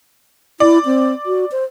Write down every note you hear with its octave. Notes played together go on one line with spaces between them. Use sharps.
E4 D5
C4
F#4
C5